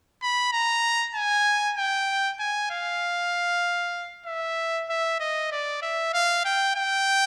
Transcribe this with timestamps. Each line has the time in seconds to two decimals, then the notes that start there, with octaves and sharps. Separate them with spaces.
0.22 B5
0.53 A#5
1.15 G#5
1.77 G5
2.40 G#5
2.71 F5
4.26 E5
4.90 E5
5.20 D#5
5.52 D5
5.82 E5
6.13 F5
6.45 G5
6.76 G5